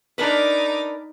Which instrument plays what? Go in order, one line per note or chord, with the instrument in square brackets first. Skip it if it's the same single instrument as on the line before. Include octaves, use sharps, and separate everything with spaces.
[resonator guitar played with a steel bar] D4 A#4 B4 [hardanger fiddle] D#4 D6